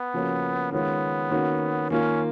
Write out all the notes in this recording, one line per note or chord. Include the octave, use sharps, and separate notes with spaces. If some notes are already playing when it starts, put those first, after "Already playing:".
Already playing: B3
C#3 F3 A#3 C#4 F#4
D#3 G#3 B3 C#4 F4
D#3 A#3 C#4 F#4
D#3 A#3 C#4 F4